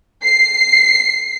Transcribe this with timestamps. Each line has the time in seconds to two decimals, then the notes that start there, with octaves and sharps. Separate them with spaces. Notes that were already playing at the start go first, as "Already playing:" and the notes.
0.24 C7